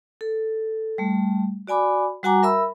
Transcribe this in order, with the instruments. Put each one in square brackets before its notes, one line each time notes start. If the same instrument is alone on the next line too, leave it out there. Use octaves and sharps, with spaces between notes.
[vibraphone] A4
G3 A3
F#4 D5 G#5 B5 D6
G3 F#4 F#5 G#5 A#5 D6
A#4 E5 B5 E6